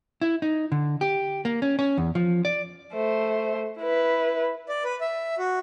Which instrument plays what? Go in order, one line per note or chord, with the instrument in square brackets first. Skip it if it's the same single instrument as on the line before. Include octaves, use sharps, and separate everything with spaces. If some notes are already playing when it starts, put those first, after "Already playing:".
[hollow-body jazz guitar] E4
D#4
D3
G4
A#3
C#4
C#4
E2
F3
D5
[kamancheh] A3 C5
E4 B4
[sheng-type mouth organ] D5
B4
E5
F#4